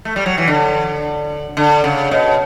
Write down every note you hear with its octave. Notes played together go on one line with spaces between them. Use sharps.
A3
G3
F#3
E3
D3
D3
C#3
B2